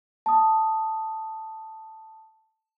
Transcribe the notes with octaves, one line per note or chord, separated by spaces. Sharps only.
A5 D#6